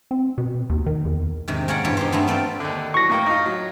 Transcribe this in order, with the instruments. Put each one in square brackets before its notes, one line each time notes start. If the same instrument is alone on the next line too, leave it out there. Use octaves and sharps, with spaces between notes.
[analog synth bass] C4
B2
D#2
D#3
E2
[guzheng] G#2 C3 D#3
G#3 A#3 C#4 C#5 D5 F#5
E2 G2 B2 F#4 G4 C#5
D#4 G4 C5
G2 A3 B3 C4
A3 C4 F4 D5
[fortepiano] D#2 D3
[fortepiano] E3 F#3 [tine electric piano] C#6 A#6
[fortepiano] A2 A#3 G5
D#4 F4
F#3